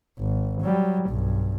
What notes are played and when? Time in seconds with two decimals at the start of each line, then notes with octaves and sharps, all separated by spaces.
0.19 G#1
0.62 F#3 G3
1.08 B1 G2